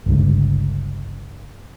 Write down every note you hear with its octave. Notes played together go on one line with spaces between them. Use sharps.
G1 C#2 G2